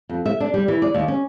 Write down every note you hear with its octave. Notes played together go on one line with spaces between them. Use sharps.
F2
E5
D4
G3
E3
D5
D#2
C#4